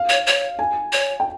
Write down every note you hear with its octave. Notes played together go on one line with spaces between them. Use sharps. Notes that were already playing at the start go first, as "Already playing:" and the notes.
Already playing: F5
C#5
C#5
G#5
C#5
G5